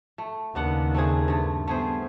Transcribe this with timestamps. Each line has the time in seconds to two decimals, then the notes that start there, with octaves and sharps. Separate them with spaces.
0.18 A3
0.55 D#2 C#3 B3 D4 F#5
0.94 A3 C4 G#4
1.28 G2 A3
1.68 G3 A3 B3 G#4 C5